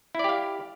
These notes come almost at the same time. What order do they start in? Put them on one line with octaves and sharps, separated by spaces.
E4 D5 G4 F5